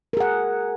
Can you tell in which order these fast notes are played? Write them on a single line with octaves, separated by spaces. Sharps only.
A#4 G#4 F#5